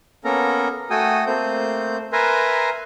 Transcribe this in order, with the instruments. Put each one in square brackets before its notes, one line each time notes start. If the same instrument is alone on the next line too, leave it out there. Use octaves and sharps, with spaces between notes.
[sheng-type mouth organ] A#3 B3 C#4 A4 A#4 A#5
A3 F#4 A4 G5 G#5 D#6
A3 A#3 C4 C5 G6
A#4 B4 E5 G#5 A#5 C6